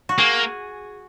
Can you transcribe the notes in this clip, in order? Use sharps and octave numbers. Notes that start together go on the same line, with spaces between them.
F#4
A#3 G#4